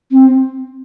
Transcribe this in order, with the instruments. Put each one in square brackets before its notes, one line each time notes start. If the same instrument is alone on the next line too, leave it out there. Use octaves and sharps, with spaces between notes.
[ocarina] C4